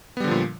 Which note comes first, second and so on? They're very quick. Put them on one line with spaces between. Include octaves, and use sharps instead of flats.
B3 G3 D3 F3 A#2